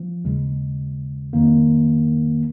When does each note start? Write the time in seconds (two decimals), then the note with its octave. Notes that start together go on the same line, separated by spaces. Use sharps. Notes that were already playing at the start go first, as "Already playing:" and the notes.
Already playing: F3
0.24 D#2 C#3 G#3
1.33 F2 D#3 A#3